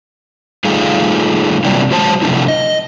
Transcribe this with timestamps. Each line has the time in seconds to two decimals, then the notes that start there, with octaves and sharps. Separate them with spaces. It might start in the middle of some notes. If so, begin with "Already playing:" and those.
0.65 G3 A3 D#4 F4 G#4 F5
1.64 C3 E3 F#3 G3 A#3 D4
1.91 F#3 G#3 C5 A5
2.22 C3 F3 G#3 A3 D4 E4
2.48 D#5